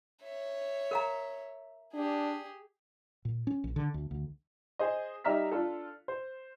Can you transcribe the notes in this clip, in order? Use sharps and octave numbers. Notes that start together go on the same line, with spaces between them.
C#5 E5
A#4 F5 A#5
D4 G4 G#4
A#2
C#4
A#1
D3
D2
D2
G#4 C5 D#5
G3 D#4 E5 A#5 F6 B6
D4 F4 A4
C5